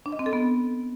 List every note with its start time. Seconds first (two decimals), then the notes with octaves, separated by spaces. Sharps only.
0.06 D4
0.12 D#5
0.19 C4
0.26 A4
0.33 B3